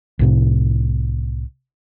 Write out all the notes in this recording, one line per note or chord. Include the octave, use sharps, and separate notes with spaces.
C2 A2 C3